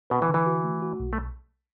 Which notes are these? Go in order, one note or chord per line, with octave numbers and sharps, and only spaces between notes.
B2 B4
E3
D3
E3
F#4
A3
F#4
B1
A3